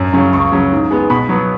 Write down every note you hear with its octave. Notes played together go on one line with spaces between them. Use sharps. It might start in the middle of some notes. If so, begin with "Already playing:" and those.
Already playing: F#2
C#3 F#3 C#4
C#2 C#6
C#3 F#3 C#4
G#2
G#3 B3
B2 B5
F#3 B3